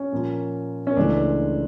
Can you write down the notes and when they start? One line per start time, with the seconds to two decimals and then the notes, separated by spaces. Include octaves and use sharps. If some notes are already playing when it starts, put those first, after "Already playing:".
Already playing: C#4
0.12 A#2 F3 A#3
0.87 C#4
0.96 C#2 C#3 E3 A3 C4 D4